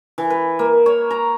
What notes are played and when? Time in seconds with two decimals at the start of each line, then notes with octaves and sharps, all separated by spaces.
0.18 E3
0.30 B4
0.59 A#3
0.86 C#5
1.10 A#5